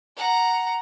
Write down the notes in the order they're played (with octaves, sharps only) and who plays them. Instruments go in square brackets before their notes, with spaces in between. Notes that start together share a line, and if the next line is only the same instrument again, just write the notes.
[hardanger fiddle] F#5 A#5